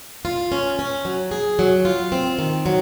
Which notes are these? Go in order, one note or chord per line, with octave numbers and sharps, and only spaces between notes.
F4
C#4
C#4
F#3
G#4
F#3
F4
C4
D#3
F#3